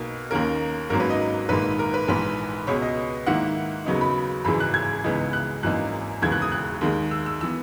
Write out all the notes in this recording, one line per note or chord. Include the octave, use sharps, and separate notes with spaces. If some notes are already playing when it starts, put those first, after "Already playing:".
Already playing: B1 B2 A#3 D#4
D#2 D#3 A#3 C#4 A#4
G#1 G#2 F#3 A#3 C#4 A#4
B4
D#5
A#1 G#2 D#3 A#3 B4
A#4
B4
A#1 G#2 E3 B4
C#2 B2 G#3 B3 C#5
D#5
G#2 D#3 A#3 E4 F#5
D#2 C#3 F#3 B3 D#4
B5
G#1 F#2 C#3 E3 G#3 B5
F#6
G#6
C#2 C#3 E3 B3 D#4
F#6
G#1 F#2 E3 A#3 D#4 F#6
E1 D#2 C#3 E3 G#6
F#6
D#6
F#6
D#2 D#3 G#3
E6
E6
E3 B3 E6